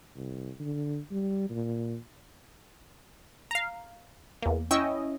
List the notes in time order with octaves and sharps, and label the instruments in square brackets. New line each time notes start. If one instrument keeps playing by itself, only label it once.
[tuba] C2
D3
G3
A#2
[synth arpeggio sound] F5 A#5
E2 A#3
[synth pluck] C#4 E4 D#5 [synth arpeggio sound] G5 C#6 E6